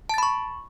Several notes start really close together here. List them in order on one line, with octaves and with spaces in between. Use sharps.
A5 A6 B5 C#6